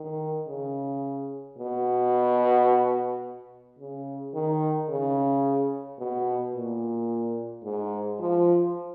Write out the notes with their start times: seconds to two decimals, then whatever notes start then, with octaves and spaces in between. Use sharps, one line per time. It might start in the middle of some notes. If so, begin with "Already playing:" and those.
Already playing: D#3
0.48 C#3
1.58 B2
3.79 C#3
4.34 D#3
4.89 C#3
5.99 B2
6.54 A#2
7.64 G#2
8.20 F3